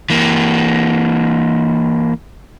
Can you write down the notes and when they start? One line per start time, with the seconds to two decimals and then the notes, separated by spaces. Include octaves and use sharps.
0.10 E3 A#3